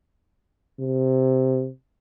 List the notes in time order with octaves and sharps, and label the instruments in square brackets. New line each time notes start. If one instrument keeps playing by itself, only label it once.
[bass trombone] C3